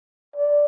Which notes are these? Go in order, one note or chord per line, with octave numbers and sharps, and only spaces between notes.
D5